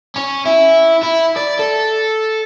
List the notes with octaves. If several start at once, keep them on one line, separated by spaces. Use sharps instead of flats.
C#4
E4
E4
D5
A4